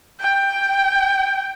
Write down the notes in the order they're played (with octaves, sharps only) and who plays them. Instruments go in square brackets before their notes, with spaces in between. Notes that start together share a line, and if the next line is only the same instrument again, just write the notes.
[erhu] G5